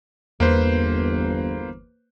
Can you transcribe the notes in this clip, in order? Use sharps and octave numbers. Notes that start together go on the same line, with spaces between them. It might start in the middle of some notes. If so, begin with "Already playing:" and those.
G1 E2 A#3 B4 C5